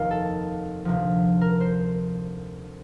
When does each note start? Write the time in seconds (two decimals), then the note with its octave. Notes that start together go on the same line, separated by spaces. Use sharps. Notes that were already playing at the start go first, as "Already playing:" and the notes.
Already playing: F1 D#2 D#3 D#4 F4
0.11 A4
0.85 D2 C3 F3
1.41 A#4
1.61 C5